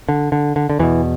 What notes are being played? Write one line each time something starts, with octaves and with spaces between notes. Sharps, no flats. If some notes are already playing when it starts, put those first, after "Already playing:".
D3
D3
D3
D3
E2 B2 E3